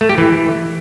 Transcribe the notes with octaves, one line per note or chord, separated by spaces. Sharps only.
A3
G4
E3